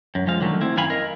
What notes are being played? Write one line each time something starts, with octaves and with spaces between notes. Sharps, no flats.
F#2
F3 G#3 F5
D3 D#3 F#3 A3
C4 E4
F#2 D#3 F5 G#5 B5
A#4 D#5 F5